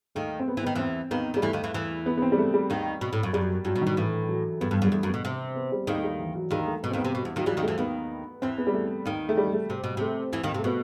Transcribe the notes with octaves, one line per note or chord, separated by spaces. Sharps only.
D#2 D#3 A3
C4
B3
E3 C4
B3
D#3
E2 E3 C4
D#2 D#3 B3
D#3 G3
E2 E3 A3
D#2 D#3
E2 E3
E2 E3
B3
B3
C4
G3
A3
G3
D#2 D#3
B2
A2
F#2
F#2 G3
G2 F#3
B2
D#3
B2
A2 E3
F#3
G2 B3
G2
F#2
G3
E2 A3
F#2
B3
B2
C3
B3
G3
D#2 D#3 G3
A3
G3
E3
F#3
D#2 D#3 G3
A3
B2 B3
C4
D#2 D#3
B3
C3
B2
E2
D#2 D#3 F#3
E2 E3 G3
D#2 D#3
A3
E2 E3
D#2 D#3 B3
E2 E3 C4
B3
G3
A3
D#2 D#3
A3
G3
A3
C3
B2
C3 A3
E2 E3
D#2 D#3
C3
A3
B2 B3